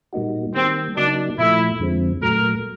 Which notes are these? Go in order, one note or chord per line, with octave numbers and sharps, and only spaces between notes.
A#2 G3 A#3 D#4 F#4
D#3 G3 A#3 C4
C#3 F#3 A#3 D4 D#4 F#4
A#2 F3 A3 E4
F2 D3 F3 G#3 C4
A#2 F#3 A3 A#4